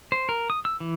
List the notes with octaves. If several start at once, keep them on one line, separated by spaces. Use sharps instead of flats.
C5
A#4
D#6
E6
E3